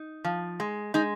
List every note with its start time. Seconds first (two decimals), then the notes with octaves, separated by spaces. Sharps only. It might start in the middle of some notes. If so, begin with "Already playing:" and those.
Already playing: D#4
0.24 F3
0.60 G#3
0.94 G#3 D#4